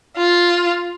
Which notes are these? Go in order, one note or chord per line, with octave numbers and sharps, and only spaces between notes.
F4